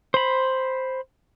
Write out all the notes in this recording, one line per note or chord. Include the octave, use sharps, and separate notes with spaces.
C5 B5